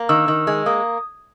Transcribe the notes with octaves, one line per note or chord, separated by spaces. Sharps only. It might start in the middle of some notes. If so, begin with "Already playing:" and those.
Already playing: A#3
D#3 E6
D#3
G#3
A#3 D#6